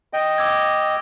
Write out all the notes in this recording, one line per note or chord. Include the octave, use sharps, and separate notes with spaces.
D#5 G5
D6 E6 G#6